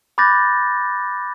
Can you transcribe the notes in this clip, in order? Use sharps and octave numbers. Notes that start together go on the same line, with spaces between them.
B5 D6 F#6 G6 A6 A#6